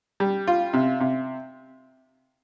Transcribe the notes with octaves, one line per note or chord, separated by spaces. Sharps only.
G3
F4
C3
C3